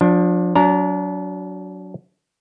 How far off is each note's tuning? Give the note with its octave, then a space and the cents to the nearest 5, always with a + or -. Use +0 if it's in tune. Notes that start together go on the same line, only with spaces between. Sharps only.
F3 +35 D4 +0
F#3 +0 D4 -35 A#5 +0